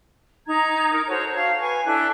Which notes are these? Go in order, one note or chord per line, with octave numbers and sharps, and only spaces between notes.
D#4 A#5 G#6
D#4 A#4
F#4 A4 C5 C#5
F#4 C#5 F5 A5
B4 G#5 C#6
D4 E4 A4 F#6